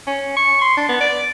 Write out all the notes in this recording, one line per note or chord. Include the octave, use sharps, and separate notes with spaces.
C#4
C#6
C6
D4
B3
D5